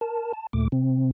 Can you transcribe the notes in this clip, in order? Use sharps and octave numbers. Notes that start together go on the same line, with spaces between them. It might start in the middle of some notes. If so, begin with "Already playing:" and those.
A#4 A5
A5
D#2 A#2 A3 D6
C3 C4